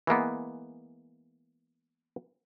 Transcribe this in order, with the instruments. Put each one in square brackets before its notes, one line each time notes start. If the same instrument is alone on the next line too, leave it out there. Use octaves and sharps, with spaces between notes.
[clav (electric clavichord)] E3 G#3 A#3 B3